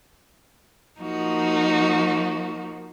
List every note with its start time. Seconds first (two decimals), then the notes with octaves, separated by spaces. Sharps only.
1.01 F3 A#3 D#4 F#4